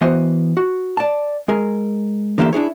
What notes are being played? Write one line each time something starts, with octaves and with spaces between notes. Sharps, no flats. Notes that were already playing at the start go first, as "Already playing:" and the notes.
E3 B3 F#4 C5 D#5
F#4
D5 A5
G#3 G#4 A#4
D3 E3 A#3 G4 E5 C6
D4 E4 G#4 C#5